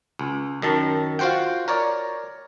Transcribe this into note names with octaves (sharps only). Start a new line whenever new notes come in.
C#2
F#2 D#3 A5
F4 F#4 C5 F#5 G5
A#4 C#5 D5